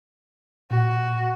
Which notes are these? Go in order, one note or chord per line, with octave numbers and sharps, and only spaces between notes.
A#2 F#4